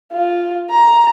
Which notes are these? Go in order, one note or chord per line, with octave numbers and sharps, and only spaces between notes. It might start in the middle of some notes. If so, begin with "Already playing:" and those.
F4
A#5